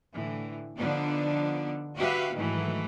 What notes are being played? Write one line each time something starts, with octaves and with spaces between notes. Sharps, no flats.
A2 D3 E3
D3 F3 B3 D4 D#4
F#4 G4 B4 E5 F5
G#2 D#3 E3 F#3 A3